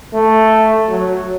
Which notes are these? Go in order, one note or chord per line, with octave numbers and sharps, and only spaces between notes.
A3
F#3